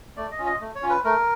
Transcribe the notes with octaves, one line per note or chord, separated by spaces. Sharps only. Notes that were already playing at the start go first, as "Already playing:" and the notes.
A3 D5
D#5
C#4 F4
D#5
A3
C#5
C#4 F4
B4
A3 A#4